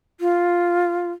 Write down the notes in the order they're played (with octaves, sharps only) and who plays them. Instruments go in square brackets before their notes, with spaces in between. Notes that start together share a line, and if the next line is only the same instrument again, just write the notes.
[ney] F4